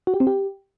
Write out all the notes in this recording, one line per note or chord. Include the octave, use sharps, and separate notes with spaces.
F#4
G4
C4
G4